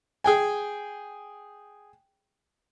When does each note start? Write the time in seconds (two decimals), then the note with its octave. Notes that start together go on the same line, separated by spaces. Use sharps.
0.24 G#4 G5 G#5